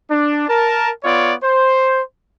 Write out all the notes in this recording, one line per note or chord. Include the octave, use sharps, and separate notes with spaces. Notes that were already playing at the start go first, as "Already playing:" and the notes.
D4
A#4 A5
B3 F4 C#5 D5
C5